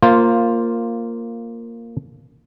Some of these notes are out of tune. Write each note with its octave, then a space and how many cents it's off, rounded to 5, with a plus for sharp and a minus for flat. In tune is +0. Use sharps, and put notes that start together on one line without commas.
A#3 -5 F4 +0 C5 +15